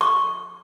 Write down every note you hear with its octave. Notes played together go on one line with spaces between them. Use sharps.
C#6